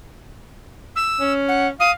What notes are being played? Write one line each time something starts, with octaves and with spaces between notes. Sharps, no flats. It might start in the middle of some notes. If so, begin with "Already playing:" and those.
E6
C#4
F#5
F5 D#6